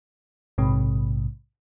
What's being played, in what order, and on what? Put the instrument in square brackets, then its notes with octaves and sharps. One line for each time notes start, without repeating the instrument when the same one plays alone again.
[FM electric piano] A#1 G#2 C3